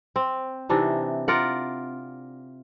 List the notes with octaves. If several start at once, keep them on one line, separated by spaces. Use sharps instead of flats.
C4
C3 E3 D4 D#4
F4 A#4 D5 F#5